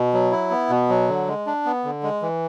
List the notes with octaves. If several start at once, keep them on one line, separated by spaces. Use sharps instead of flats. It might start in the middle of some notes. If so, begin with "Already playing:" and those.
Already playing: B2
F#3
E4
B3
B2
F#3
D3
G#3
D4
B3
D3
G#3
E3